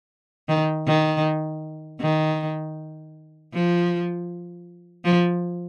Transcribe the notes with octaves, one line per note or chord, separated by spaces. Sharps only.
D#3
D#3
D#3
F3
F3